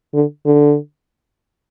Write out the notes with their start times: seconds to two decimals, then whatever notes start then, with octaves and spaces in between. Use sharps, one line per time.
0.14 D3
0.46 D3